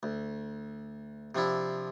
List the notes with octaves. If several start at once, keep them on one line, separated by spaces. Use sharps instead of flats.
D2
C3 F3 D4 E4